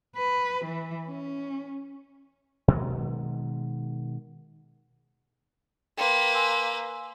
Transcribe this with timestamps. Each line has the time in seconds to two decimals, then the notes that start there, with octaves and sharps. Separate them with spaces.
0.16 B4
0.64 E3
1.07 C#4
2.68 B2 D#3 F#3 G#3
5.98 A#3 B4 G5 C6
6.35 G#5 C6 E6